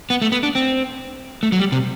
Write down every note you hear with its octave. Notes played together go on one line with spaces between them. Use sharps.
B3
A3
B3
D4
C4
A3
F#3
G3
C3